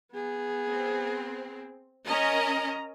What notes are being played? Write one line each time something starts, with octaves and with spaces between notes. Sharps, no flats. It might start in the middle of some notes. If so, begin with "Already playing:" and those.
B3 G#4
C4
C#4 A#4 D#5 A#5